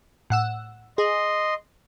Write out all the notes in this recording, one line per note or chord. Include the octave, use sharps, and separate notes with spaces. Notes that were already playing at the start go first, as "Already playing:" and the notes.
A2 F#5 E6
G#4 D#5 C6